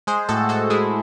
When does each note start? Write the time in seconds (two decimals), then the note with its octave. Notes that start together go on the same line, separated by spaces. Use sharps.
0.07 G#3 G#4 C5
0.29 A2 F#4 A4
0.49 A2 F#4 A4
0.70 G#3 E4 G#4